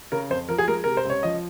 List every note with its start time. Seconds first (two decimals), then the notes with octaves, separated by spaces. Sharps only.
0.12 C#3 A#4
0.30 F2 C5
0.49 F3 A#4
0.58 G#4
0.68 G#3 A#4
0.84 C3 A#4
0.97 C5
1.05 C#2 C#5
1.23 F3 D#5